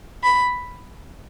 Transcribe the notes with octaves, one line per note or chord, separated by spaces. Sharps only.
B5